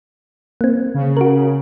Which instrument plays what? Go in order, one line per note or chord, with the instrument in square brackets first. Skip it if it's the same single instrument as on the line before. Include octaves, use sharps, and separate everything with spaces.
[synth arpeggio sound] A#3 C4
[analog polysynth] C#3
[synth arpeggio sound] F#4 A#4